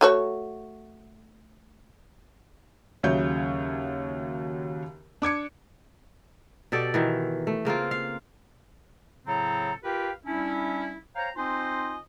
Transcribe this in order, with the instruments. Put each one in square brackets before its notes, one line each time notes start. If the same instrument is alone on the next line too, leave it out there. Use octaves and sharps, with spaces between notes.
[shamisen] A3 F#4 C#5
[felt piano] D#2 C#3 F#3 C#5 E5 G6
D4 D6 G#6 C#7
[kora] B2 G4 A4 D5
B2 D#3 E3
A3
C#3 A#3 C4 F4
F5
[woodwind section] A2 C#3 F#3 C4 A4 A#5
F4 G4 A#4 B4 F5 G5
G3 C#4 D4 E4
C5 C#5 F5 G5 A#5
C4 D#4 F4 C5 D#5 G#5